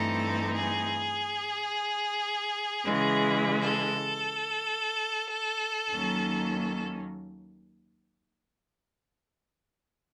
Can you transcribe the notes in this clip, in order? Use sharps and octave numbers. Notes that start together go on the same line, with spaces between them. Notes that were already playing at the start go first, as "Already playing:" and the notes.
Already playing: G2 E3 A3 C4 D#4 A4
G#4
C#3 E3 G#3
A4
D#2 D#3 F#3 A#3 C#4